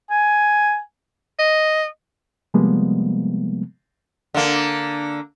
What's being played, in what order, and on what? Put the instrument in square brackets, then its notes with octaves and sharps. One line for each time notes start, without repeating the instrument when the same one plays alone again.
[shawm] G#5
[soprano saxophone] D#5
[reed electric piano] C3 F3 G3 G#3 A#3 B3
[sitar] D3 A#3